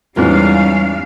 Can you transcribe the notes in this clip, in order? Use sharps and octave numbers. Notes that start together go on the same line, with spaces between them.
E2 G#2 G3 C#4 F4 F5